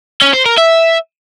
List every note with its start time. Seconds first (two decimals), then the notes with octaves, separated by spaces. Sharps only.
0.22 C#4
0.34 C5
0.46 A#4
0.57 E5